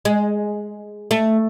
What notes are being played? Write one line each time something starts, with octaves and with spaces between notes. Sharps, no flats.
G#3
A3